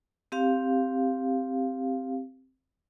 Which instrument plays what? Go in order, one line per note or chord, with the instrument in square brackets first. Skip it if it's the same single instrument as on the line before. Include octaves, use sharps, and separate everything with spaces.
[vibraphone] C4 G4 F5